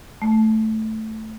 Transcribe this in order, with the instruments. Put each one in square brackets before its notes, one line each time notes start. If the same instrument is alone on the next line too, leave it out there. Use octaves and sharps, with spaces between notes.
[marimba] A3